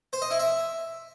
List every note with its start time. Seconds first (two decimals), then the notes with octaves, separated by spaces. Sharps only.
0.13 C5
0.22 D#5
0.31 E4
0.39 E5